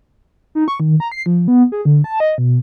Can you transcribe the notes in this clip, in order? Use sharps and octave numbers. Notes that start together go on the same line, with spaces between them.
D#4
C#6
D#3
A#5
C7
F3
B3
G#4
D3
A5
D#5
B2